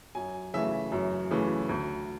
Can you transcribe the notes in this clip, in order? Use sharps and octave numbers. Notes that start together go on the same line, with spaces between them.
F#2 G#5
C#3 E3 A3 E5
F#2
C#3 E3 A3
D2